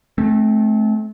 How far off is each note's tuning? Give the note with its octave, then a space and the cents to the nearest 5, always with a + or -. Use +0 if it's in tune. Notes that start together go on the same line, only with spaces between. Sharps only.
A3 -30 C4 +15